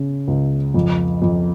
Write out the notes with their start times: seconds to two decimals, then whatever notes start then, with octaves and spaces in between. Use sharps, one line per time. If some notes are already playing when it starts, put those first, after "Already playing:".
Already playing: C#3
0.28 C#2
0.74 F2
1.22 F2